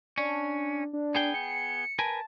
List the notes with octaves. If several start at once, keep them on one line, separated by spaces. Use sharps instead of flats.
C#4 D4
D4
B3 G#4 G5
C#7
A#4 B4 G#5 A5